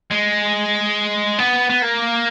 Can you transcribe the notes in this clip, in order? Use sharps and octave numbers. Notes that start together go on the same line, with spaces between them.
G#3
B3
B3
A#3